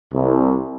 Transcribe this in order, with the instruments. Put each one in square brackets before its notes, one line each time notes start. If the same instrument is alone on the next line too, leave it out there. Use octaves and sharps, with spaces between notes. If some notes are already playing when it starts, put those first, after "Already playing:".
[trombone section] C2